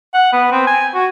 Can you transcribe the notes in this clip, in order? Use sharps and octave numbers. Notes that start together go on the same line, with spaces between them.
F#5
B3
C4
G#5
F#4